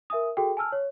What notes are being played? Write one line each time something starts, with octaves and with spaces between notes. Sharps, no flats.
A#4 E5 G#5 D#6
F#4 G#4 A4 G5
G#5 A5 E6 F6
C#5